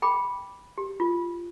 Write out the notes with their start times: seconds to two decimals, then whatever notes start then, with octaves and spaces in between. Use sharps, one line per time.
0.02 G5 B5 D6
0.78 G4
1.00 F4